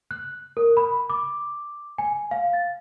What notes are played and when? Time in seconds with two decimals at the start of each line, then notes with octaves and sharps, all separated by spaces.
0.11 F#6
0.57 A#4
0.77 B5
1.10 D6
1.98 G#5
2.31 F5
2.53 A6